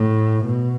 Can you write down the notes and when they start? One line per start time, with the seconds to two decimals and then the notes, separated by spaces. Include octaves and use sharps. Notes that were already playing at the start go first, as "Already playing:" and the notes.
Already playing: A2
0.45 B2